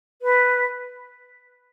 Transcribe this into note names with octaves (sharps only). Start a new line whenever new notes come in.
B4